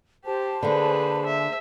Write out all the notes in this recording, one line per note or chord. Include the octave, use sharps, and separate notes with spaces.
G4 C5 A5
D3 A#3 G#4 B4
E5